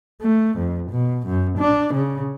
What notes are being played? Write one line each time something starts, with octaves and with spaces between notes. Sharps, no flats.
A3
F2
B2
F#2
D4
C#3